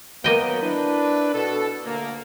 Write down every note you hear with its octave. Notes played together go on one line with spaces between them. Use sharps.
F#3 A#3 B3 D#5 G5
D4 E4 B4
B2 A4
D2 A#3